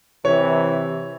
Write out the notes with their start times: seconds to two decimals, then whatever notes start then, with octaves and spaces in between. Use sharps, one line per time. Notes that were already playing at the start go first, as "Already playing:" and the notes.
0.25 C3 E3 C#5